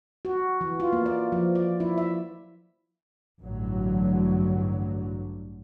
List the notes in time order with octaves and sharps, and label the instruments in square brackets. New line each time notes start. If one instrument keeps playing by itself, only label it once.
[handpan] F#4
E3
F4
A#3
D5
F3
D5
E4
E5
[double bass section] A1 G2 D3 F#3